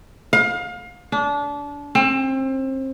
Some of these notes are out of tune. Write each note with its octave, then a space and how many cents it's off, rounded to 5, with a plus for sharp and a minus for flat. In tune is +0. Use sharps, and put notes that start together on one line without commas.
F5 +30
D4 -25
C4 +30